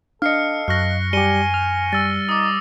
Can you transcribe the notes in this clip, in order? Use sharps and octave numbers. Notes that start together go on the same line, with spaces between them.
D4 A4 D#5 F5 F6 C7 C#7
F#2 C#6 F6 F#6 A#6
G3 G4 G#5 C#7 D#7 G7
F6
G3 E6 A6
D#4 D6 D#6